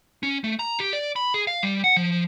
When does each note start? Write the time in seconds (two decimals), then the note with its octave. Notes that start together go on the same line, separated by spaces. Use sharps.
0.23 C#4
0.44 A3
0.59 A#5
0.80 G4
0.93 D5
1.16 B5
1.34 G#4
1.47 F5
1.63 G3
1.84 F#5
1.97 F3